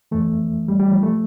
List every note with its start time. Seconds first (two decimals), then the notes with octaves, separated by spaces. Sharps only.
0.11 F2 E3 A3
0.68 G3
0.79 G3
0.91 F3
1.03 F3 A3